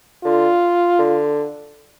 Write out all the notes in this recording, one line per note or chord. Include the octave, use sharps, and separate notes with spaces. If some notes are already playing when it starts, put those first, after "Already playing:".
D3 F4
D3